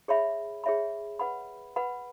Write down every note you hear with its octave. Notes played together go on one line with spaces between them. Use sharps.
G#4 C#5 E5 B5
G#4 C#5 E5 B5
B4 F#5 B5
B4 F#5 B5